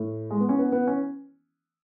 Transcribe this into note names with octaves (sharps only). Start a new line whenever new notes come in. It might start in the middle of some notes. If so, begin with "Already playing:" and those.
Already playing: A2
G#3
B3
C#4
B3
B3
C#4